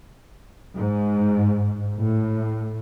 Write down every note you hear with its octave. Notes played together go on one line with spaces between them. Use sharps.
G#2
A2